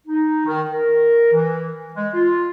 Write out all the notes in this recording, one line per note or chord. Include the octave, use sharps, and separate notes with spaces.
D#4
D#3
A#4
E3
G#3
F4